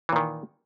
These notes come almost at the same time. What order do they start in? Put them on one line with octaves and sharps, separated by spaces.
E3 A#2 D#3